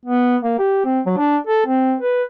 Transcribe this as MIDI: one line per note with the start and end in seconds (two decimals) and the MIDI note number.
0.05 0.37 59
0.43 0.56 58
0.59 0.83 67
0.85 1.00 60
1.06 1.14 54
1.18 1.37 62
1.47 1.62 69
1.66 1.95 60
2.00 2.23 71